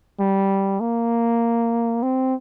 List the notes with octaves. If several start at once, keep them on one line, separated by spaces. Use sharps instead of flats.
G3
A#3
C4